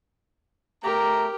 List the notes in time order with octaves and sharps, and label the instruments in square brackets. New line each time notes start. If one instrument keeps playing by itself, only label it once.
[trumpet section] A3 A#5 [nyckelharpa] G4 A#4